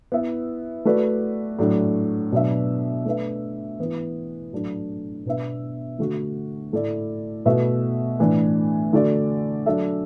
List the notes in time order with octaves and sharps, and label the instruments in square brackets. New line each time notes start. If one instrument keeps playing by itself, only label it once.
[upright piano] B3 E4 B4 E5
A3 F#4 B4 D5
A2 F#3 D4
B2 F#3 D4 B4 E5
A3 D4 B4 E5
E3 B3 E4
A2 F#3 D4 A4
B2 B3 D4 B4 E5
D3 A3 F#4
A2 A3 E4 D5
B2 A3 F#4 B4 E5
A2 E3 A3 D4
D3 A3 F#4 D5
F#3 D4 A4 E5